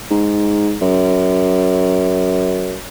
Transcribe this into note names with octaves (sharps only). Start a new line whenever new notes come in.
G#2
F#2